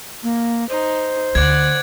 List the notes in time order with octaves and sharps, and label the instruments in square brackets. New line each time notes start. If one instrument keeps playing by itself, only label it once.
[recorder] A#3
[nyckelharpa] D#4 [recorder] C5
[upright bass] D2 [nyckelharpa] D5 F#5 [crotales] G#6